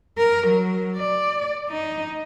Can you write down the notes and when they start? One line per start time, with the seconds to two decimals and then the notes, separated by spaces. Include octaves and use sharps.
0.18 A#4
0.47 F#3
0.96 D5
1.70 D#4